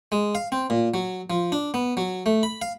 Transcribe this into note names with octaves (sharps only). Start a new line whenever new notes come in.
G#3
F5
C4
A#2
F#3
F3
D4
B3
F#3
A3
B5
F5